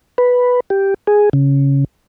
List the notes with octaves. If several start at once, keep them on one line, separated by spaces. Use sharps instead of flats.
B4
G4
G#4
C#3